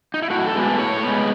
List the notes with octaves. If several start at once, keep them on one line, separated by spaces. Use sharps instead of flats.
D#4
E4
A2 F#4
A4
G#3 B3
A4
A2 C#5
G#3 B3